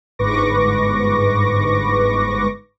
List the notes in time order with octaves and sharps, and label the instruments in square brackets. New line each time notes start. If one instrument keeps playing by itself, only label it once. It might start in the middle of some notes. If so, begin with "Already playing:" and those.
[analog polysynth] G1 G#2 B4 C#6 D6 A#6